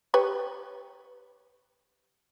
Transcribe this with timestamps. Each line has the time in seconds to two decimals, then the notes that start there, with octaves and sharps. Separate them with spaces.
0.14 G4 B4 C#5